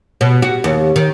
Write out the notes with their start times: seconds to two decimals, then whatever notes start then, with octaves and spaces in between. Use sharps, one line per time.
0.21 B2
0.42 F#4
0.64 D#2
0.96 D#3